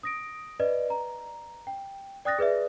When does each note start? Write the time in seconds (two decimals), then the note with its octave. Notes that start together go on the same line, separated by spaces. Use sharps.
0.03 D#6 A#6 D7
0.60 B4 D5 D#5
0.90 A#5
1.67 G5
2.25 D5 G5 D#6 F#6 A6 A#6
2.39 G#4 B4 D5 E5